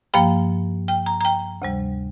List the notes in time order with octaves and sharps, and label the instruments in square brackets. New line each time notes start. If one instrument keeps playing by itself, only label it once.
[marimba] G2 F3 A#3 G5
G5
A#5
A#5
G5
D2 C3 G3